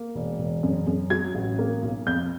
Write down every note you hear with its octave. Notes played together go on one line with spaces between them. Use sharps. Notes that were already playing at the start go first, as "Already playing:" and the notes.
Already playing: A#3
E1
E1
F#2
F#2
F#3 G#6
A1
A#3
B1
F2 G6